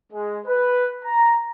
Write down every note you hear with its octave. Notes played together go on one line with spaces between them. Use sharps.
G#3
B4
A#5